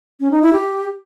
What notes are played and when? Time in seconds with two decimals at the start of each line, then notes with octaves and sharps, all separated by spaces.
0.20 C#4
0.31 D#4
0.42 E4
0.53 G4